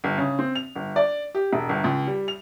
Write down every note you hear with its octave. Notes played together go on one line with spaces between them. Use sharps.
G1
C#3
C4
F7
G1
D5
G4
E1
G1
C#2
G3
F7